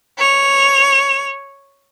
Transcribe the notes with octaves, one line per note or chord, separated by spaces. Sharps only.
C#5 F7